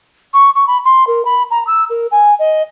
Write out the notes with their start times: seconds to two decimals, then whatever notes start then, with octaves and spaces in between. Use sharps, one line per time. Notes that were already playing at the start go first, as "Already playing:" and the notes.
0.34 C#6
0.55 C#6
0.67 B5
0.85 C6
1.07 A#4
1.25 B5
1.51 A#5
1.67 E6
1.90 A#4
2.11 G#5
2.39 D#5